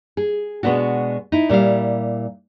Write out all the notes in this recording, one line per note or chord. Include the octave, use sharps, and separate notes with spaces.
G#4
B2 G#3 B3 D4 F#4
D#4 E4
A#2 G3 E4 F5